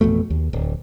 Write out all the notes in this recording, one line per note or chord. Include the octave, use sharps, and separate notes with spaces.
A1 F2 B2 A3
D#2
D1